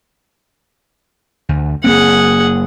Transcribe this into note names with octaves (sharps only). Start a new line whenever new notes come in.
D2
F#1 A#3 C4 G#4 F#5